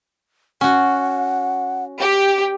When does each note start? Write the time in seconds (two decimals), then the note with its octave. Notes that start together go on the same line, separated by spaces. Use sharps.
0.61 C#4 F#4 F#5
2.00 G4